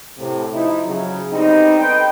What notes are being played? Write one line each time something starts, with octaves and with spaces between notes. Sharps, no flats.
A2 C3
F3 D#4 E4
C#3 F#3
D3 G3 B3 C4 D#4
A4 B4 C5 D#5 G5